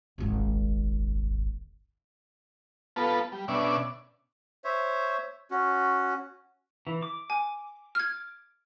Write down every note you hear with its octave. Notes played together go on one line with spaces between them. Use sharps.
D#1 G#1
B3 F4 A4 B4 A5
G3
B2 C#4 D4 D5 E5
C5 C#5 E5
C#4 F#4
E3
D6
G#5
F6 G#6